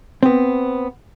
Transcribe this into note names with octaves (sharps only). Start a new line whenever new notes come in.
B3 C4